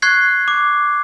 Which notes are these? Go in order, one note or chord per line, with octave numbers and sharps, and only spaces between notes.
C#6 F#6 G#6 C7
D6